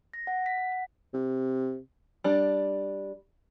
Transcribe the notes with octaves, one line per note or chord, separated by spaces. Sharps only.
A#6
F#5
B6
F#5
B6
C3
G3 D4